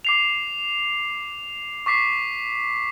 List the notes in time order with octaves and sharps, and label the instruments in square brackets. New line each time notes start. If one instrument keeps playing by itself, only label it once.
[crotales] D6 C7 F7
C#6 D6 B6 C7